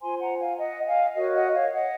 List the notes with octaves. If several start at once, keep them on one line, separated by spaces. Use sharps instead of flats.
F4 C5 G#5 C6
F#5 A#5
F5 G#5
D#5 F#5
F#5
F5 G#5
F#4 A#4 C#5 D#5
D#5 F#5
C#5 F5
D#5 F#5